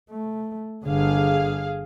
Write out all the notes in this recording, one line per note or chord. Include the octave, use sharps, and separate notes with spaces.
A3
G1 D3 G#4 F5